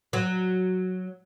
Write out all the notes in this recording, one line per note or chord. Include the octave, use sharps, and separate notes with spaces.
F#3